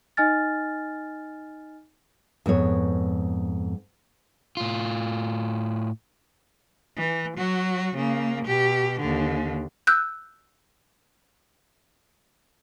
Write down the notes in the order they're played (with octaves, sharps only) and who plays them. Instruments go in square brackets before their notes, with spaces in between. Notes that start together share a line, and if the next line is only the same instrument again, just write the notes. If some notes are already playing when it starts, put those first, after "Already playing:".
[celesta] D#4 D#5 G#5 F6 A6
[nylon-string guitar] F2 G#2 B3 C#5
[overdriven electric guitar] A2 F4
[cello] E3
F#3 F#4
C#3 A#3
B2 G4
D#2 D3
[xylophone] E6 F#6 G6